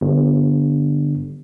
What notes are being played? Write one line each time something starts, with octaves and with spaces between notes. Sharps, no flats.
G1